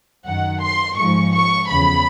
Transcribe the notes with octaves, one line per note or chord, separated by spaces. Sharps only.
F#2 D#3 F#5
C6
G#2 F3 C#6
C#6
E2 C#3 F3 B5